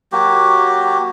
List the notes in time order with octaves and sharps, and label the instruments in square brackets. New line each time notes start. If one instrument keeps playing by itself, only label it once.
[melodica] F#3 A#3 F#4 G4